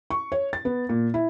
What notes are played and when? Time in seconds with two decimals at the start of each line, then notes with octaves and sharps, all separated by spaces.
0.10 C#6
0.32 C#5
0.53 A6
0.65 B3
0.89 A#2
1.14 E4